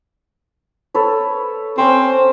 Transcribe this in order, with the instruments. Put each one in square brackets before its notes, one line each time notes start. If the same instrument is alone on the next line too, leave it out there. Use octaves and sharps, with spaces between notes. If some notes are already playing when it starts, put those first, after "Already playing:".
[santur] A4 B4 C#5
[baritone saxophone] C4 [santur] C#4 C5